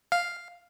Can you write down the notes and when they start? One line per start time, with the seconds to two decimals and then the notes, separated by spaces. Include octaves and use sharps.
0.12 F5